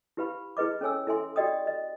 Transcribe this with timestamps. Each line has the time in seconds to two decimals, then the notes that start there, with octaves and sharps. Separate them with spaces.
0.17 E4 G4 B4 F5 B5
0.57 E4 G#4 B4 D#5 D6
0.81 C#4 A4 C#5 G#5 E6
1.07 E4 A4 E5 G#5 C6
1.36 F#4 G4 D5 D#5 G5 D#6
1.67 D#5